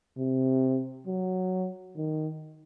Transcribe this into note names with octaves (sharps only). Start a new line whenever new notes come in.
C3
F#3
D#3